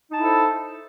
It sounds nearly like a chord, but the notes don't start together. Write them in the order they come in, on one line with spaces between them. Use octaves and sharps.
D#4 A5 E4 A4 C5